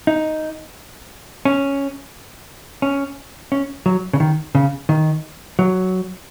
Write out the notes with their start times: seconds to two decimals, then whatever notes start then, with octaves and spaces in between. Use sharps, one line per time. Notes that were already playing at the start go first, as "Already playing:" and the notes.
0.07 D#4
1.45 C#4
2.82 C#4
3.52 C#4
3.86 F#3
4.13 C#3
4.20 D#3
4.55 C#3
4.89 D#3
5.59 F#3